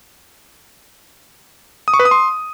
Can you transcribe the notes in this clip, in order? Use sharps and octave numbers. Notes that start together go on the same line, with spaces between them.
D#6
C#6
B4
D#6
C6